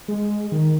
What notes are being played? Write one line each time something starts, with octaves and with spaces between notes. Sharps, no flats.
G#3
D#3